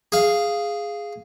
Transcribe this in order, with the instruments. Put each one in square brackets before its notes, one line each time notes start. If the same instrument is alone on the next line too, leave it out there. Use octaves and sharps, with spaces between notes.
[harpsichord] G#4 F5